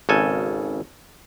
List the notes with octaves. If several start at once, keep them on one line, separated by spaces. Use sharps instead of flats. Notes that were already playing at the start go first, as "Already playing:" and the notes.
G#1 C#3 A4 G#5